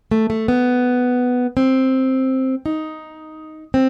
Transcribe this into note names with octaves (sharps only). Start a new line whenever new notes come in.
A3
A3
B3
C4
D#4
C4